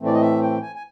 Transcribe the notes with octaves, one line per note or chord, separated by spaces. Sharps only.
A2 E3 A3 C4
D5
D#5
E5
G5
G#5
G#5